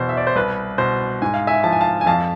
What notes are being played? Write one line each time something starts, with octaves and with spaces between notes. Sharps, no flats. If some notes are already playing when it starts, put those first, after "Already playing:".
Already playing: E2 B2 C5
E5
D5
C5
C2 B4
B2 C5
G#2 G#5
F5
E5 G#5
F3 A5
G#5
F5 A5
G#5
F2 F5 A5